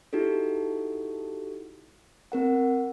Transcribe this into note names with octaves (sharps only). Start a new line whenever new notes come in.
D#4 E4 F#4 G4 A4
C4 A#4 F#5